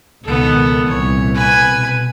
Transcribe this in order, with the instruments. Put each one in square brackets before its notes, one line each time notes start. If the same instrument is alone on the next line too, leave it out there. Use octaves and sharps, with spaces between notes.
[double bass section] C#2 B2 D#3 [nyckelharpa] B3 A4
[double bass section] C2 A#2 E3 [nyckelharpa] C#5
[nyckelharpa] B4 G#5
[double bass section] B2